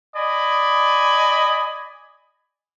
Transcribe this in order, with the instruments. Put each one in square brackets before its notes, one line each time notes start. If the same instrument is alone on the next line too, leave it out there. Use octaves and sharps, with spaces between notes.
[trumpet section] D5 G#5 B5 [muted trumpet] D#5